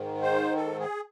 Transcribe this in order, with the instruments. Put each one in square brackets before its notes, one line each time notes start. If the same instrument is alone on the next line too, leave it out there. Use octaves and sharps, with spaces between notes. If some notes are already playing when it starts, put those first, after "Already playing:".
Already playing: [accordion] G#2 D#3
C5
A4
G#4